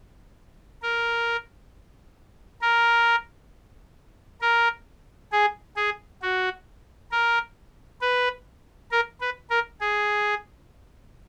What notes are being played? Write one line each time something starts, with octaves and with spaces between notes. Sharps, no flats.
A#4
A#4
A#4
G#4
G#4
F#4
A#4
B4
A#4
B4
A#4
G#4